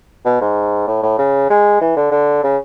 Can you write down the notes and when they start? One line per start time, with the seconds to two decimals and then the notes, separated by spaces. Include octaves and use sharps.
0.25 B2
0.41 G#2
0.87 A2
1.03 A2
1.18 C#3
1.50 G#3
1.81 E3
1.96 D3
2.11 D3
2.43 C#3